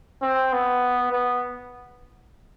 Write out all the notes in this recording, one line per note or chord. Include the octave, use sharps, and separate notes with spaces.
C4
B3
B3